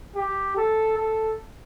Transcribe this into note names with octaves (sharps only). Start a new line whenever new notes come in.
G4
A4
A4